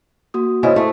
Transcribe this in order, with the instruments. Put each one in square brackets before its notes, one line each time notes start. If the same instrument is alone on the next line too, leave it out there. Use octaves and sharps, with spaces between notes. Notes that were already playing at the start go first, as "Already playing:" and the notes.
[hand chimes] A#3 F#4 D#6
[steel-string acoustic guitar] G#2 C#3 E4 [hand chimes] C5 D5 D#5
[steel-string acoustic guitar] A3 [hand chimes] E4